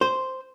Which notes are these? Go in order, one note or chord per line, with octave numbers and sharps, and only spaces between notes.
C5